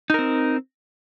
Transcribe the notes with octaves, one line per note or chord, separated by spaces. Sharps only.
C4 D#4 A#4